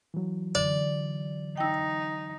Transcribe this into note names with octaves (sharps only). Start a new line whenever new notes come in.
E3 F#3
D3 D5
D#4 G5 E6